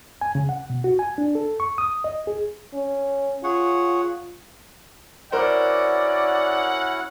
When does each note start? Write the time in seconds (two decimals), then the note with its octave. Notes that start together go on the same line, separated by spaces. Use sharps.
0.21 G#5
0.35 C#3
0.49 F#5
0.70 B2
0.84 F#4
0.99 G#5
1.18 D4
1.35 A4
1.60 C#6
1.78 D#6
2.04 D#5
2.27 G#4
2.74 C#4
3.44 F4 G#4 C#5 F#5
5.32 C#4 E4 F#4 A#4 C5 D5 F#5